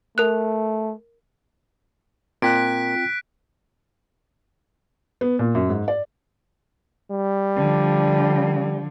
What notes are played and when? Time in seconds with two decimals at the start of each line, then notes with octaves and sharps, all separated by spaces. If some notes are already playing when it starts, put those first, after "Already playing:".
0.18 A3 A#4 F#6
2.42 A#2 C4 F4 G5 F#6 B6 D7
5.21 B3
5.39 A#2
5.55 F#2
5.69 G#2
5.88 D5
7.11 G3
7.56 D3 F3